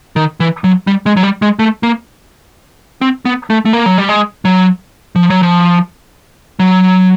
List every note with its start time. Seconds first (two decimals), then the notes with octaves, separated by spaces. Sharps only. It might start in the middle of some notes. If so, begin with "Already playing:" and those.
0.16 D#3
0.40 E3
0.64 F#3
0.87 G3
1.06 G#3
1.17 F#3
1.23 G3
1.42 G#3
1.59 A3
1.83 A#3
3.01 C4
3.25 B3
3.50 A3
3.65 A3
3.73 A#3
3.86 F#3
3.98 G3
4.09 G#3
4.45 F#3
5.16 F3
5.30 F#3
5.43 F3
6.59 F#3